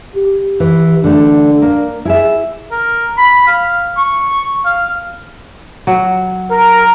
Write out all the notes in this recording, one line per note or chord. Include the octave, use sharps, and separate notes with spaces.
G4
E3
D3 A3 D4
A#3 A#4
E4 G#4 E5
A#4
B5
F5
C#6
F5
F#3
A#4